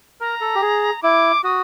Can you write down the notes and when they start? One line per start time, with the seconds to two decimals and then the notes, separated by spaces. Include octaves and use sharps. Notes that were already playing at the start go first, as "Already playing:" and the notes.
0.21 A#4 A#5
0.41 A4
0.55 G4
0.62 G#4
1.03 E4 D6
1.44 F#4 D#6